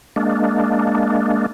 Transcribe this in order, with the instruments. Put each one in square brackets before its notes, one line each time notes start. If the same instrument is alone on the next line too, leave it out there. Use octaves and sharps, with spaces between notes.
[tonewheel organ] G#3 A#3 D4